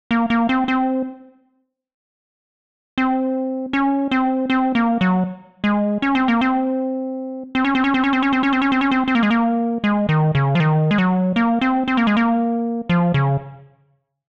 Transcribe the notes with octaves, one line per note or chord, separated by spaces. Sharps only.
A#3
A#3
C4
C4
C4
C#4
C4
C4
A#3
F#3
G#3
C#4
C4
A#3
C4
C4
C#4
C4
C#4
C4
C#4
C4
C#4
C4
C#4
C4
C#4
C4
C#4
C4
C4
A#3
G#3
A#3
G#3
D#3
C#3
F3
D#3
G#3
F#3
A#3
C4
C4
A#3
G#3
A#3
F3
C#3